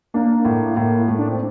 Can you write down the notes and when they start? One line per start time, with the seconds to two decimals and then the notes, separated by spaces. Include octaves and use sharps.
0.14 A#3 D4
0.45 A2
0.77 A2
1.08 A3
1.18 D4
1.29 C4